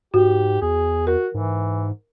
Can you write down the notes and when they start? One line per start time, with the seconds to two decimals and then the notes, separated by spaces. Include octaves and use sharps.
0.14 G#2 F#4 G4
0.62 E2 G#4
1.07 F#4 A#4
1.34 G#2 E3